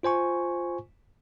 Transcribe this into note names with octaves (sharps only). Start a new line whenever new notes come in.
F4 C5 G#5 C#6